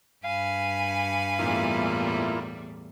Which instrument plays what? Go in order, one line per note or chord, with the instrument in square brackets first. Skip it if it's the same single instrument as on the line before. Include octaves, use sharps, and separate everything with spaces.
[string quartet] G2 G#5 B5 [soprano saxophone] F5
[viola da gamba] E2 A2 G3 [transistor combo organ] A#3 E4 F4